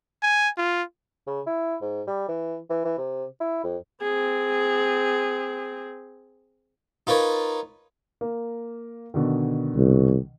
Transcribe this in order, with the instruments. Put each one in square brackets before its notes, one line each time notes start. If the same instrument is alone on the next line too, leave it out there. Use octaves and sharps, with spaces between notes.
[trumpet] G#5
F4
[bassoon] C#3
E4
G#2
G3
E3
E3
E3
C3
E4
F2
[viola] C4 G#4
[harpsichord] D#4 F4 A#4 B4 C#5
[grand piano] A#3
B2 D3 D#3
[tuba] C2